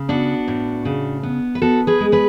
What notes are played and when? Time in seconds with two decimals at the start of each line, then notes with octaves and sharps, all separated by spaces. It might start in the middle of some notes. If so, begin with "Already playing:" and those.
Already playing: C#3
0.09 B3 D4 F#4
0.48 A2
0.85 C#3
1.23 B3
1.55 B4
1.62 B3 F#4 A4
1.87 G#4 B4
2.00 G#3
2.12 G#4 B4